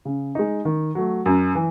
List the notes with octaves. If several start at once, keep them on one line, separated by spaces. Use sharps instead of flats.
C#3
G#3 D#4
D#3
F#3 A3
F#2
E3